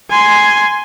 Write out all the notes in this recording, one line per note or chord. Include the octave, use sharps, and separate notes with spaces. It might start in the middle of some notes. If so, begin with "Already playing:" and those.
G#5 C6